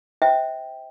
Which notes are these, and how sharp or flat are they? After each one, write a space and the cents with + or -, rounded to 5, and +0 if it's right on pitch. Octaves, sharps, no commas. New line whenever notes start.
C5 +5 E5 -40 G5 +0